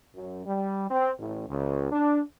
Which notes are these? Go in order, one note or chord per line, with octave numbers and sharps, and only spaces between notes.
F#2
G3
C4
A1
C#2
D4